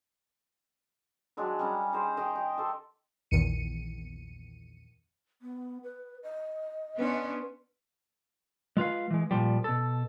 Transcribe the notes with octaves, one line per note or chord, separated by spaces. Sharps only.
D#3 F#3 G#3 D4
G3 C#4 A#5
D#4 G#4 A#4 C5
D#3 D#5 G5 A#5
G5
G4 A4 C5
A#1 E2 D#3 C#7 D#7
B3
B4
D#5
B3 C#4 D4 B4 C6
G#3 F4 B4 F5
E3 G#3
A#2 F3 G3
B2 A4